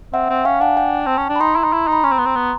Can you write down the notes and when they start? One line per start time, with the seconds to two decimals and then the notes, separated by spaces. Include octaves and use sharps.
0.13 C4 E5 F#5
0.30 C4
0.45 C#4 F5 G5
0.61 D4 F#5 G#5
0.77 G5 A5
1.06 C4
1.17 C#4
1.29 D4
1.36 B5
1.40 D#4 A#5 C6
1.56 E4
1.64 D#4
1.73 E4
1.88 D#4 B5
2.04 C#4 A#5 C6
2.11 C4
2.19 B3
2.26 C4
2.35 B3